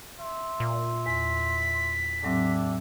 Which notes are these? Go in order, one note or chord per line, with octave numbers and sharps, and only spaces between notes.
E5 C6
A#2
E2 B6
A2 F#3 C4 D4 G4 E5